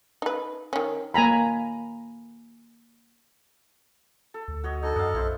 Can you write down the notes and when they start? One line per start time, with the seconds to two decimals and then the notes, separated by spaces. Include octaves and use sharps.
0.22 D#4 B4
0.73 D#3 C#4
1.14 A#3 G#5 A#5 B5
4.34 A4
4.48 D2
4.64 F#4 C#5 D#5
4.82 D4 D#4 A4 D#5
4.96 F#2 F5 F#5
5.15 B1 E4 C5